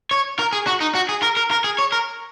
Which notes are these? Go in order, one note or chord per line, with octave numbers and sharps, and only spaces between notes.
C#5
A#4
G#4
F#4
D#4
F#4
G#4
A#4
A#4
A#4
G#4
C#5
A#4